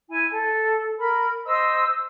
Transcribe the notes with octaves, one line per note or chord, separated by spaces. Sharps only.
E4 G#5
A4
A#4 B5
C5 D#5 E6